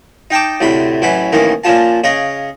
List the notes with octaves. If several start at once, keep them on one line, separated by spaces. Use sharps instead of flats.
D#4 G5 A5 D6
D2 A2 C3 B5 C6
A1 E3 F#3 C#4 B5
A1 D#3 E3 A#3 C#4
A#2 F3 C#4 F4 A5
C#3 C#5 D#5 F5